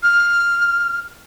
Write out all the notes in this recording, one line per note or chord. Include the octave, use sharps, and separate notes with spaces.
F6